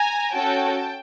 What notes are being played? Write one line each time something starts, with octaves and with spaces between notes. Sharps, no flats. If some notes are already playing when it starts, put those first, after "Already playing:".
Already playing: G#5 A#5
C#4 F#4 A4 G5 A5